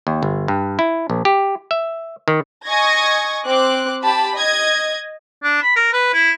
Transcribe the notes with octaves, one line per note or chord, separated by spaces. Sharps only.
D#2
G1
G2
E4
A#1
G4
E5
D#3
D#5 G#5 C#6 G#6 A#6
C4 D6 F#6
G4 A5 B5
D#5 G#6
D4
B5
A#4
B4
E4